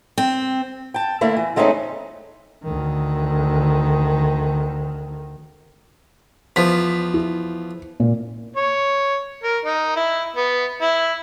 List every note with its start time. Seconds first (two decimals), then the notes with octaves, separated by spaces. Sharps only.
0.18 C4
0.94 G5 A5
1.21 D3 A3 A#3 E4
1.37 E3
1.56 E3 G#3 A3 C4 C#4 D#4
2.63 D2 D#3
6.56 E2 F3 B6
7.14 E4
8.00 A#2
8.56 C#5
9.43 A#4
9.65 D#4
9.96 E4
10.36 B3
10.81 E4